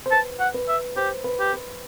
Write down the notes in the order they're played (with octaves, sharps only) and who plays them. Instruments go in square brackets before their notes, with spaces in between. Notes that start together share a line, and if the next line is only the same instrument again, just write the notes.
[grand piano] C5
[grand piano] B4 [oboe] A5
[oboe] F#5
[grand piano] B4
[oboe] E5
[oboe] G4 [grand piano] C5
[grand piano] B4
[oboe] G4
[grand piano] B4